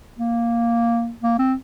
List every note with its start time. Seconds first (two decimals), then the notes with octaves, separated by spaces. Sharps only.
0.19 A#3
1.22 A#3
1.39 C4